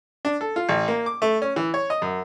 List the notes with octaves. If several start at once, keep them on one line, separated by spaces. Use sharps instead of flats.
D4
A4
F4
A1
A#3
D6
A3
C#4
E3
C#5
D#5
F#2